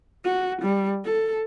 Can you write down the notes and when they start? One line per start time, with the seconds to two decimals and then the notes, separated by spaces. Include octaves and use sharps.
0.24 F#4
0.61 G3
1.05 A4